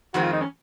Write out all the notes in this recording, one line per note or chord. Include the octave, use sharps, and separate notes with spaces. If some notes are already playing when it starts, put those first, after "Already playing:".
F2 D#3 G#3 C4 F#4
F4
D#4
C#4